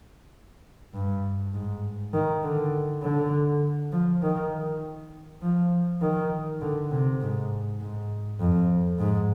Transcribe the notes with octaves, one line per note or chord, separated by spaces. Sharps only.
G2
G#2
D#3
D3
D3
F3
D#3
F3
D#3
D3
C3
G#2
G#2
F2
G#2